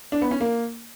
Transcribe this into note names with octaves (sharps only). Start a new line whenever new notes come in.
D4
B3
C#4
A#3